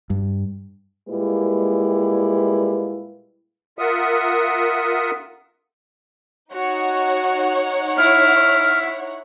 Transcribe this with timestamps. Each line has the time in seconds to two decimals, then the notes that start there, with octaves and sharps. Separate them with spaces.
0.10 G2
1.08 A#2 G3 G#3 A#3 E4 B4
3.79 F4 A#4 E5 F#5 D#6
6.53 D#4 F#4 C#5 F#5
7.98 E4 F6